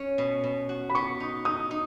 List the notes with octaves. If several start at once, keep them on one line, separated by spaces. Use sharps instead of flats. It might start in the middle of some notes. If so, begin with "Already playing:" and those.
Already playing: C#4
B2
B2
F#4
B5
B3 C#6
D#4
D#4 D#6
D#4